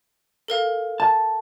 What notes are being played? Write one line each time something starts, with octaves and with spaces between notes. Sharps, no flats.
A4 A#4 F5
A5